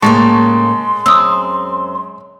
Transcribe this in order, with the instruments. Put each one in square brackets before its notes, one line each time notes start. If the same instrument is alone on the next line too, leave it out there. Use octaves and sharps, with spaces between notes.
[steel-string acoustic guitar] A2 C#3 A#3 [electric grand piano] G#3 A5 C#6 [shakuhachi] C6
[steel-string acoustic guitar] F#2 C4 [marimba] D#6 E6